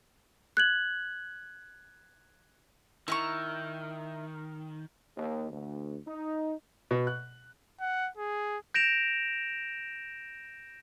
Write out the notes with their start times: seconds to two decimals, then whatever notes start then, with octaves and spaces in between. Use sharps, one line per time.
0.57 F#6 G#6 F#7
3.08 D#3 E4 A#5 C#6
5.17 D#2
5.51 D2
6.07 D#4
6.91 B2
7.07 F#6
7.80 F#5
8.17 G#4
8.74 G6 A#6 D7 E7 F7